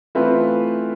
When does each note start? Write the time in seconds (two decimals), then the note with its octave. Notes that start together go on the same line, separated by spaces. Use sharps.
0.15 E3 A3 C4 F4 B4